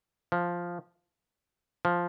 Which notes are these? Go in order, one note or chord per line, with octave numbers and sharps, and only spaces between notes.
F3
F3